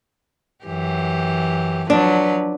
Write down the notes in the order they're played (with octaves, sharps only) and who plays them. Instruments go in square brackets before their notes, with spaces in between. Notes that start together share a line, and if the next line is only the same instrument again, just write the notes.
[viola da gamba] F#2 E3 G4
[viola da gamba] F3 F#3 B4 [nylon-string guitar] D4